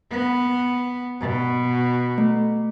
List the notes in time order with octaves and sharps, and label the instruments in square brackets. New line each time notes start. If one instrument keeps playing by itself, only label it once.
[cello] B3
B2
[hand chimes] A3